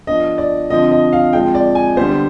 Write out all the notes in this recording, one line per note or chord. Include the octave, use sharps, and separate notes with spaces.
F3 B3 D4 D#5
D5
D3 F3 C4 D#5
D#5
F5
F3 G#3 C4 G5
D5
G#5
D3 G3 B3 C5